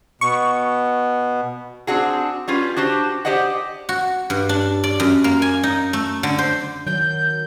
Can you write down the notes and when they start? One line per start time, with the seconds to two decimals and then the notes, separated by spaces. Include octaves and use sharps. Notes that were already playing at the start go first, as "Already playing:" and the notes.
0.21 B2 C#6
1.87 C4 D4 F#4 G#4
2.48 G3 C#4 F4 B4
2.76 D4 F#4 G4 C5
3.25 G4 C5 D5 D#5 F#5
3.89 F#4
4.30 G2
4.49 D4
4.84 D5
5.00 F#2
5.24 A#3
5.42 G#5
5.63 D#4
5.93 A3
6.23 D3
6.39 C5
6.87 D#3 F#3 G6